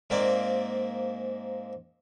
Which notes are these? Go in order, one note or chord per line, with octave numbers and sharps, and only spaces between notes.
G#2 A#3 C4 D5